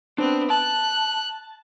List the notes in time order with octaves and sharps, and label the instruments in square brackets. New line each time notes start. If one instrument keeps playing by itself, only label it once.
[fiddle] B3 C4 [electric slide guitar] D4
[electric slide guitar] A5 [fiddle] F#6